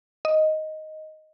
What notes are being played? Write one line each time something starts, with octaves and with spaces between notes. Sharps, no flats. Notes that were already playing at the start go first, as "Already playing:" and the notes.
D#5